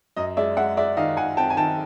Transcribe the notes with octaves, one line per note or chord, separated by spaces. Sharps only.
F#2 D#5
G#3 D5 E5
G#3 E5 F#5
G#3 D5 E5
D#3 D#5 F5
D#3 F#5 G#5
C4 G5 A5
G#5
D#3 G5 A5